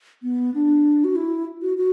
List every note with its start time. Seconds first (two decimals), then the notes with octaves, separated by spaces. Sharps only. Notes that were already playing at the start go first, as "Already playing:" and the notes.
0.23 B3
0.54 D4
1.04 F#4
1.16 E4
1.62 F#4
1.78 F#4